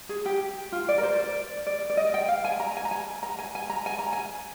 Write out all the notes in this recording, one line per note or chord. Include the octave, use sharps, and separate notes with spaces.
G#4
G4
F4
D5
A#4
C5
D5
D5
D5
D#5
G5
F5
G#5
A#5
G#5
A#5
G#5
A#5
G#5
G#5
A#5
G#5
A#5
G#5